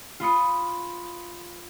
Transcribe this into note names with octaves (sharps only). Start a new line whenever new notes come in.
F4 B5 D#6 C#7